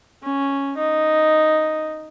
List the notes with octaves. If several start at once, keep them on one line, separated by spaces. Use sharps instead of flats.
C#4
D#4